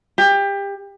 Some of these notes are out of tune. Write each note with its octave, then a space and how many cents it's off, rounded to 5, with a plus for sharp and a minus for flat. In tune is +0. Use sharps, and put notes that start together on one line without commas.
G4 +25